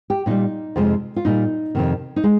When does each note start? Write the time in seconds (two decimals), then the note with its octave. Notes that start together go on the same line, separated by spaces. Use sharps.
0.10 G4
0.26 A#2 G3 D#4
0.76 F2 C3 F3 G#3
1.16 F4
1.25 A#2 G3 D#4
1.75 F2 C3 D#3
2.16 D#4
2.24 G#3